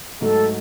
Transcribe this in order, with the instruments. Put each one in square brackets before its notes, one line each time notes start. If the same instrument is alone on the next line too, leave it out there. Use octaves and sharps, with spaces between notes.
[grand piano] G#2 F#3 A3 [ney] A4